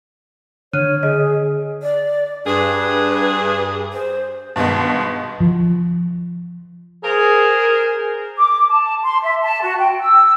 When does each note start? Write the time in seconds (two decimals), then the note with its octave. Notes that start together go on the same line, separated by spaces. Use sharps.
0.73 D3 C#5 F6 F#6 D#7
1.03 G#4 D#5
1.83 D5
2.46 G2 G#4 B4
3.93 C5
4.56 G2 B2 D#3 G#3 B3
5.40 F3
7.04 G#4 A#4 C5
8.37 D6
8.69 A5
9.03 C6
9.22 E5
9.42 A5
9.61 F#4
9.78 G5
10.00 E6